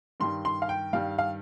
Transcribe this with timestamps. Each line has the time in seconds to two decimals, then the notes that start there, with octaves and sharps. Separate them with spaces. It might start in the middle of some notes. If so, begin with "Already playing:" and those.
0.20 G2 D#3 G3 C6
0.45 C6
0.62 F5
0.69 G5
0.93 G2 D#3 G3 F5
1.18 F5